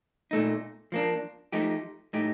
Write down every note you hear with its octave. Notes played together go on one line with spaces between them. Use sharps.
A#2 A3 D#4
F3 A#3 D4
F3 A3 D#4 G4
A2 A3 D#4 G4